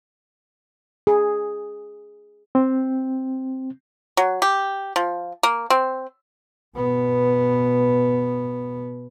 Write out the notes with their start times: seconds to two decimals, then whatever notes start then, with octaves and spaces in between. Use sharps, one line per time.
1.07 G#4
2.55 C4
4.17 F#3
4.42 G4
4.96 F3
5.43 A#3
5.70 C4
6.77 B2 B3